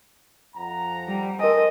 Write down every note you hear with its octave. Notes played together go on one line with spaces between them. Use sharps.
F2 F#5 A#5
G3
A4 A#4 C5 D#5 G#5